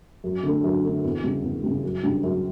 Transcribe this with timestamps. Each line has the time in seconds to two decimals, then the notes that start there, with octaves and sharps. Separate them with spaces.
0.24 F#2
0.43 D3 A3
0.64 F#2
0.84 D3 A3
1.04 E2
1.24 C#3 G3
1.43 E2
1.63 C#3 G3
1.84 F#2
2.03 C#3 G3 D4 G4
2.23 F#2